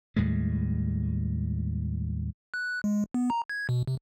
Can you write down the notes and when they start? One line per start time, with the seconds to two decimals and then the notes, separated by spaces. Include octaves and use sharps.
0.16 D#2 A2 G3 G#3
2.54 F#6
2.84 G#3
3.14 B3
3.30 A#5
3.49 G#6
3.69 B2
3.87 C3